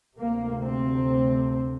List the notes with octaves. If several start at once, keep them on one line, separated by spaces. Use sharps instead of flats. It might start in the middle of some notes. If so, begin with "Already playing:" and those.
D2 C3 A#3
C4